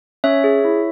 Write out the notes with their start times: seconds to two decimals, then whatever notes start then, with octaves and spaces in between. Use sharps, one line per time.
0.24 C#4 C#5 E5
0.44 G#4
0.65 E4